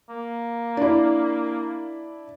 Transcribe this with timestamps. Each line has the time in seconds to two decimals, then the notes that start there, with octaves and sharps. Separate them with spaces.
0.09 A#3
0.77 D4 E4